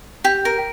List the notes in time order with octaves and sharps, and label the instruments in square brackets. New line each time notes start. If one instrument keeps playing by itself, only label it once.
[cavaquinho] G4
A#4